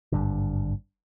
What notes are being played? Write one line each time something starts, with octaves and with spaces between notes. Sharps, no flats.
G#1 G2 D3